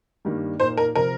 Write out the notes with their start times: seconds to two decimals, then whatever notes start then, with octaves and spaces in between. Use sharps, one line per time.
0.25 G2 D#3 G3 A#3
0.60 A#2 A#3 D#4 C5
0.77 A#4
0.95 C3 F3 C4 A#4